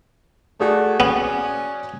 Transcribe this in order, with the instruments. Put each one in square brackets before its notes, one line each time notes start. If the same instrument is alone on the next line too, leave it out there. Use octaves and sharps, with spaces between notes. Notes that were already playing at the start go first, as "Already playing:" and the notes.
[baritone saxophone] A3 [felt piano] F#4 G#4 D5
[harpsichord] B3 [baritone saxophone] C#4